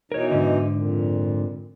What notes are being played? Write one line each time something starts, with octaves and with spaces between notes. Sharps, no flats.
B2 E3 D#4 A#4 C#5
G#2 D3
F2 A#2